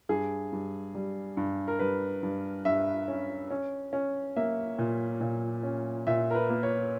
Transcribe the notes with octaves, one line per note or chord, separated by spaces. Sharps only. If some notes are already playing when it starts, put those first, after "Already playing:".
G2 G#4
G2
G3
G2
A#4
G2 B4
G2
G2 E5
C#4
C#4
C#4
A#3 E5
A#2
A#2
C#4
A#2 E5
A#4
B4
A#3
C#5